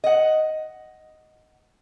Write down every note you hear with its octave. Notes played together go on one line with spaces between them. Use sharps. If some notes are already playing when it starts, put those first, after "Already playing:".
D#5 F#5